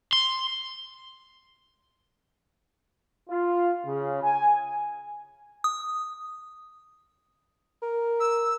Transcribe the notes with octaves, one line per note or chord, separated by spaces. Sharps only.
C6
F4
C#3
G#5
D#6
A#4
E6